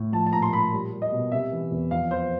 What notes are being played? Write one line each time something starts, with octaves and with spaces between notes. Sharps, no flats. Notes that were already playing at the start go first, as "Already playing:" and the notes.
Already playing: A2
F3 A5
A5
A#2 A#5
C6
A#2 B5
G3
G3
D#5
B2
C3 E5
E3
E2
F2 F5
E3 C5